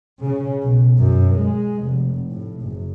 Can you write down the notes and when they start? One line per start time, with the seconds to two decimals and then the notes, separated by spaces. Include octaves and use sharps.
0.23 C#3
0.64 B1
0.99 F#2
1.35 G#3
1.83 F1
2.29 A2
2.62 F#1